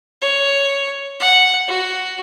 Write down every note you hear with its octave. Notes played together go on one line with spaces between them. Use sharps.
C#5
F#5
F#4